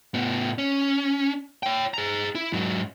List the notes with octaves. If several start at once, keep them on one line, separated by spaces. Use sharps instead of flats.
A2 B3
C#4
C#5 G5
G#4 A#5
E4
G#2 F#3